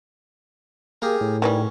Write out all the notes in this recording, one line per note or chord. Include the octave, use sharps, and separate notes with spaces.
A#3 G4 G#4 A#4
A2
D#3 E3 G3 C#4